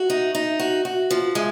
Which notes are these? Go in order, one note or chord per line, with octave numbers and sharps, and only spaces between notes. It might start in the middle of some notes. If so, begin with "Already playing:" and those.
Already playing: F#4
D#4
D#4
F#4
F#4
F3
G#3